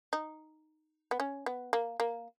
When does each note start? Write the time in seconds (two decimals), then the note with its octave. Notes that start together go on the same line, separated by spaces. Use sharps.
0.13 D#4
1.11 B3
1.20 C#4
1.46 B3
1.73 A#3
2.00 A#3